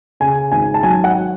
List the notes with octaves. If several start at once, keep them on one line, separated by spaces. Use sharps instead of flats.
C#3 G#5
G#1 G#5
A5
F#3 G#5
F#5